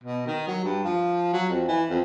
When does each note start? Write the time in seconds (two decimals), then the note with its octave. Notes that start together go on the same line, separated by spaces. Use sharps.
0.03 B2
0.26 D#3
0.47 F#3
0.64 G2
0.84 F3
1.33 F#3
1.50 F2
1.68 E3
1.90 F2